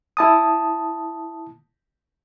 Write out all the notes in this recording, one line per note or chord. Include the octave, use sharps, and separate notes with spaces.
E4 A5 D#6